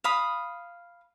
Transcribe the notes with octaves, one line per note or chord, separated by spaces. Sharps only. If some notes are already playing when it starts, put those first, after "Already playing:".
F5 B5 D#6